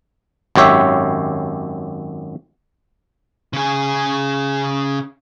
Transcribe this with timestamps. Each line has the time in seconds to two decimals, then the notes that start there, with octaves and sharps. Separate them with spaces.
0.55 G#1 F#2 G4 C#5 E5
3.53 C#3 G#4